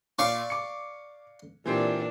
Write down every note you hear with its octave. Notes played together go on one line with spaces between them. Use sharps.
A#2 D5 F5 C#6
D6 C#7
A#2 E3 C4 D4 G4